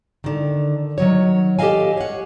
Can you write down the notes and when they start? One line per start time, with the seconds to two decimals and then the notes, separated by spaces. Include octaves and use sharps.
0.24 D3 D#3
0.98 D#3 F#3 C#5
1.59 G4 A4 C5 D#5 F5 G#5
1.97 C#5 F#5